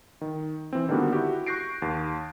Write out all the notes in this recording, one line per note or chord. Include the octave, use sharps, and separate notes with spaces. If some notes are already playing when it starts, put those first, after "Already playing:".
D#3
E3 C4
D3 D#3 G3 A#3 B3 F#4
E4 F#4 G4
C#6 F#6 G6 A#6 C7 D7
D#2